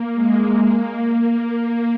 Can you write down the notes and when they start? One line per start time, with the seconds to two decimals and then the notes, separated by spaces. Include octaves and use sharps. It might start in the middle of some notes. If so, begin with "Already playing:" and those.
Already playing: A#3
0.14 G#3
0.66 A#3